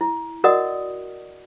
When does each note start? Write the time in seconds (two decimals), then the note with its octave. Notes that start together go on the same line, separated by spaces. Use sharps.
0.01 E4
0.44 F#4 A#4 D5 D#5 F#5 D#6